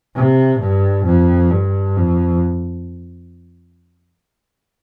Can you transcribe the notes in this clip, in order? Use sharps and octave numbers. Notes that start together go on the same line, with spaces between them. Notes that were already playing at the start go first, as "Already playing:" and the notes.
C3
G2
F2
G2
F2